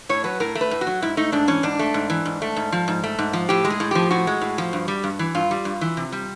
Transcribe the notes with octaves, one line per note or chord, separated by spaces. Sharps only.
A2 C#5
F#3 B4
A2 A#4
A3
B4
A2
F#4
F#3
G#2 E4
A3 D#4
G#2 D4
E3 C#4
G#2 D4
A3
G#2
E3
G#2
A3
G#2
F3
G#2
A3
G#2
F3
A2 G4
G#3
G#4
A2
F3 G4
A2 F#4
G#3
A2
F3
G2
G3
G2
E3
G2 F4
G3
G2
E3
C3
G3